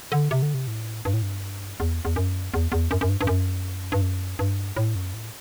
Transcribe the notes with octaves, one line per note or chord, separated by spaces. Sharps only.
D3
C3
D3
C3
A2
G2
A2
G2
E2
E2
F#2
E2
E2
F#2
F#2
G2
G2
F#2
G2
F#2
G2
A2
F#2
A2